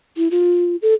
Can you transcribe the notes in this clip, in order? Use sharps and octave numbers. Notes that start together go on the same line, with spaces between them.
E4
F4
A4